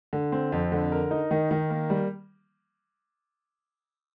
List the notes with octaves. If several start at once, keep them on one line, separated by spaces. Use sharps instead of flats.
D3
C4
F2
D3
A#4
D#4
D#3
D#3
A#3
G3